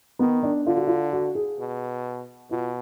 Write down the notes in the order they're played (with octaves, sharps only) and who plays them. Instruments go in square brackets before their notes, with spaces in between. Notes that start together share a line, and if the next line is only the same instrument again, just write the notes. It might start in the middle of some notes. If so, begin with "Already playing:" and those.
[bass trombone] D#3 [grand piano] B3
[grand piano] D4
[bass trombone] D3 [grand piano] F4
[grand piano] F#4
F4
F#4
G#4
[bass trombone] B2
[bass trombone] B2 [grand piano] F4